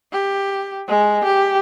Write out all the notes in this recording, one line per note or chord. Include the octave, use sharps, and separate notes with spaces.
G4
G#3
G4